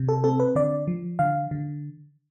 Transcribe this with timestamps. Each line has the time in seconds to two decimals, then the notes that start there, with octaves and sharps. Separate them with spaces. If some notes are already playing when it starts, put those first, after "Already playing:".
Already playing: C3
0.09 A4
0.24 C4 A4
0.40 B4
0.55 D3 D5
0.87 F3
1.19 D3 F5
1.51 D3